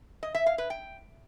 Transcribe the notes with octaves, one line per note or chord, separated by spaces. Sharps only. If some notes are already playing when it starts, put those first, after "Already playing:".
D#5
E5
F5
B4
G5